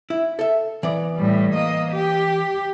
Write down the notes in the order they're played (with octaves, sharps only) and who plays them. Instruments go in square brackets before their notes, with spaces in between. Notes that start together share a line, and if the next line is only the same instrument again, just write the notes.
[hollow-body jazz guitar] E4
A4 E5
E3 B3 D5
[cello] A2 G3
A#3 D#5
G4